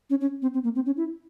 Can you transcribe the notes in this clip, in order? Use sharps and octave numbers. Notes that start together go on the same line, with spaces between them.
C#4
C#4
C4
C4
A#3
C4
C#4
E4